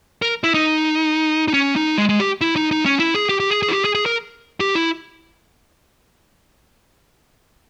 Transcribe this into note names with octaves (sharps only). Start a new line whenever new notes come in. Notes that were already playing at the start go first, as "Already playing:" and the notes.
A#4
E4
D#4
D#4
C#4
D#4
G#3
G#3
G4
E4
D#4
D#4
C#4
E4
G#4
G4
G4
G#4
G#4
E4
G4
G#4
G#4
A#4
G4
E4